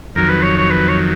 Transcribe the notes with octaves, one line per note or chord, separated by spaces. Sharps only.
F2 D#3 F#3 A#4
B4
C#5
C#5
B4
C#5